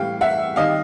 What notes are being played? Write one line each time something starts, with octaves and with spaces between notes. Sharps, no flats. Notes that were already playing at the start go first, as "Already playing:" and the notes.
Already playing: A2 E3 G3 F5 G5
E5 F#5
D#3 G3 D#5 F5